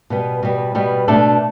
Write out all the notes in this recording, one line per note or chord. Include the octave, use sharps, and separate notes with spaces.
B2 G3 B3
B2 G3 B3
B2 G3 B3
B2 A3 D4 A4